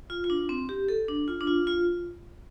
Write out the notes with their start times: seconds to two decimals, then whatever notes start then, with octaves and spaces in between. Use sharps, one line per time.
0.10 F4
0.24 F4
0.30 D4
0.49 C4
0.69 G4
0.89 A4
1.08 D4
1.28 F4
1.41 D4
1.47 F4
1.67 F4